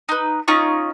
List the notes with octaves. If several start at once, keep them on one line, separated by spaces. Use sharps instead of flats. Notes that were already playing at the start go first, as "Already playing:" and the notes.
D#4 B4
C#4 D#4 F4 C#6